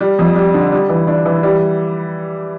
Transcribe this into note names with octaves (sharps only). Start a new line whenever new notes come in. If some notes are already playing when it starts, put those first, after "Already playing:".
G3
F2
G3
D3
G3
E3
D4
E3
G3